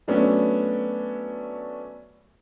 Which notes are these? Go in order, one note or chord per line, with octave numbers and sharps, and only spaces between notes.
F#3 A3 B3 C#4 D4